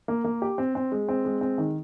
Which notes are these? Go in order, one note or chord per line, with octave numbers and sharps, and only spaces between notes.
A#3
A#3
G4
C4
C4
G#3
C4
G#3
C4
D#3